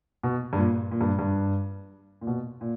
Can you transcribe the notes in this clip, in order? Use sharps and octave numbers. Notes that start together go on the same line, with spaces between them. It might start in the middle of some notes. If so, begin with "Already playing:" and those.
B2
G2
A#2
A#2
G2
G2
A#2
B2
A#2